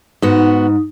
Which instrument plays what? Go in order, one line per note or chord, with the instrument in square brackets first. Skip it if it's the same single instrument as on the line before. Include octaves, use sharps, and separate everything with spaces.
[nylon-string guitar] G#2 [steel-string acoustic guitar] B3 F#4 [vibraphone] D#4